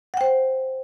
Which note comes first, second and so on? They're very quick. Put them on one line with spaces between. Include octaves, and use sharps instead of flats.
F#5 G5 C5